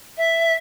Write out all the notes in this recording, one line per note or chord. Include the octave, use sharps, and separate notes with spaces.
E5